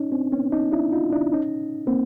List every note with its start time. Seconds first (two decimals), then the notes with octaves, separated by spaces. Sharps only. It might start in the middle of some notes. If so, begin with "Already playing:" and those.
Already playing: C#4 D#4
0.12 C4 D4
0.32 B3 C#4
0.52 C#4 D#4
0.72 D4 E4
0.93 D#4 F4
1.13 D4 E4
1.33 C#4 D#4
1.87 A#3 C4